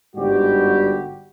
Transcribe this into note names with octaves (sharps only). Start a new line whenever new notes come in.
G1 G#2 G3 F#4 G4